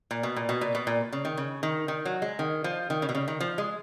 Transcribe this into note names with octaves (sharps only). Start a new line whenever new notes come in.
A#2
B2
A#2
B2
A#2
B2
A#2
C#3
D#3
C#3
D#3
D#3
F#3
G#3
D#3
F3
D#3
C#3
B2
C#3
D#3
F3
G#3